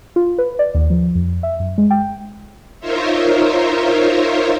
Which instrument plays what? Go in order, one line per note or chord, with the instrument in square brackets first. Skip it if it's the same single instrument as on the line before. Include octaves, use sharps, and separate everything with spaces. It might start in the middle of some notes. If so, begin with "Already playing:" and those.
[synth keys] F4
B4
D5
D#2
F3
F2
E5
F#2
G#3
G5
[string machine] D#4 F4 A#4 C5 C#5 E5